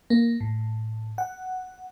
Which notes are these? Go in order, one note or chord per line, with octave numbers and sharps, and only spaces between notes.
A#3
A2
F#5